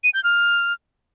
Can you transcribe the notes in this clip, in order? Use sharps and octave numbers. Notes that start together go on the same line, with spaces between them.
D#7
G6
F6